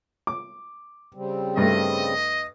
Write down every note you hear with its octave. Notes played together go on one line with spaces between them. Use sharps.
D6
C#3 G3 C4
G2 A3 D#5